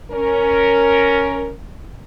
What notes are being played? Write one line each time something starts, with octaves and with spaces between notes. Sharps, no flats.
C#4 A#4